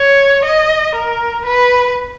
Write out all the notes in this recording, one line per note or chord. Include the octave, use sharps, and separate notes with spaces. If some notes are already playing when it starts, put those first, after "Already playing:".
Already playing: C#5
D#5
A#4
B4